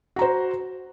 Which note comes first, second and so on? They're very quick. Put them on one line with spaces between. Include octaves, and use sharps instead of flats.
F#4 A#5 C5